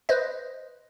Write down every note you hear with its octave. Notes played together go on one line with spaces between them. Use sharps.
B4 C5 D#5